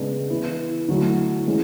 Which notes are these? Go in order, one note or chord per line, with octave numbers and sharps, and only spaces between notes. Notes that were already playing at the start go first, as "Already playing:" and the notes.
Already playing: C#3 G#3 B3 D4
E3 B3 E4
D3 F#3 A3 E4
E3 G#3 C#4